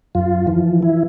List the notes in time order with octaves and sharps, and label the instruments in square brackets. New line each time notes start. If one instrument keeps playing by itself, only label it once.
[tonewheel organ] F#2 F4
E3 F3
E3 E4